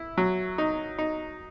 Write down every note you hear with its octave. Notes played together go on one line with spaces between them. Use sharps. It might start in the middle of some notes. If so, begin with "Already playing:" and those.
Already playing: E4
F#3
D#4
D#4